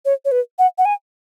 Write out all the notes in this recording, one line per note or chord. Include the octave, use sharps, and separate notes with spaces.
C#5
C#5
B4
F#5
F#5
G#5